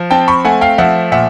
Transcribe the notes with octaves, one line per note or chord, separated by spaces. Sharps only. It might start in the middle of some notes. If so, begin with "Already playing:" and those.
Already playing: F3
C4 G5 A5
B5 C#6
A3 F#5 G#5
F5 G5
F3 E5 F#5
A#2 E5 F#5